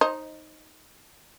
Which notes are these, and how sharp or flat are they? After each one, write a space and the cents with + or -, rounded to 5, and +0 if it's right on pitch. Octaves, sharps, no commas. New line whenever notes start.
D#4 +0 C5 +25 D#5 +10